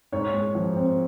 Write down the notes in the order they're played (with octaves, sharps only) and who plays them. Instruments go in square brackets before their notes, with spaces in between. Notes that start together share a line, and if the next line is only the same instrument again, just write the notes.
[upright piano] G#2 C#5
G#3
F3
C4